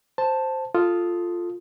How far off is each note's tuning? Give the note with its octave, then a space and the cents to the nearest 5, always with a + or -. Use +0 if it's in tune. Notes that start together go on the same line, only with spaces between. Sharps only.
C5 +0 A5 +0
F4 +0 A4 +0 D#6 +0